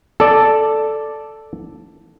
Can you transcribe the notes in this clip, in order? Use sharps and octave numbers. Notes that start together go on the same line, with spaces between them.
A4 D5